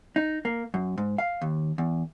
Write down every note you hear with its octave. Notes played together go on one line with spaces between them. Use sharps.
D#4
A#3
F#2
G#2
F5
D#2
E2